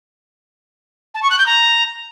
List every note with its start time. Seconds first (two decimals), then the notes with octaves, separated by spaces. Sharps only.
1.14 A5
1.22 C#6
1.30 F#6
1.38 G6
1.46 A#5